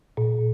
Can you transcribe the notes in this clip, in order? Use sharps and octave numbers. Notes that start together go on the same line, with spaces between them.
A#2